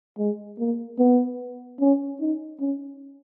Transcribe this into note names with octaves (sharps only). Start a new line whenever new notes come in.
G#3
A#3
B3
C#4
D#4
C#4